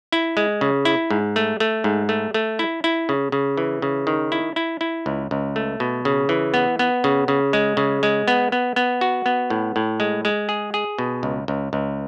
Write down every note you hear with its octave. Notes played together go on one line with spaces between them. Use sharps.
E4
G#3
C#3
E4
G#2
A3
A3
G#2
A3
A3
E4
E4
C#3
C#3
E3
C#3
D#3
E4
E4
E4
C#2
C#2
A3
B2
C#3
E3
B3
B3
C#3
C#3
G#3
C#3
G#3
B3
B3
B3
F#4
B3
A2
A2
G#3
G#3
G#4
G#4
B2
C#2
C#2
C#2